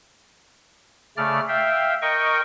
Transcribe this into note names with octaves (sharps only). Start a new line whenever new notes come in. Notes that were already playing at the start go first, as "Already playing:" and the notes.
C#3 A3 D5 F6
E5 F5 G5
A#4 D#5 G5 C#6